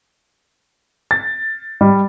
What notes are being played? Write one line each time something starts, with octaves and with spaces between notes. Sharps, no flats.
A6
G3